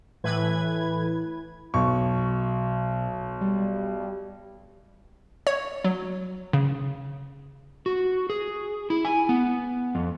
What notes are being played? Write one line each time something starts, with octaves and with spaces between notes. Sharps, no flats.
A2 E3 B4 G#6
B1 B2 C#6
G3
C#5
F#3
C#3
F#4
G#4
E4
G#5
B3
F2